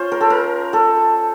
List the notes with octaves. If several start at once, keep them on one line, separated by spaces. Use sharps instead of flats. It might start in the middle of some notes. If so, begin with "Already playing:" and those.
Already playing: C#4 F4 C5
A#4
A4
A#4
A4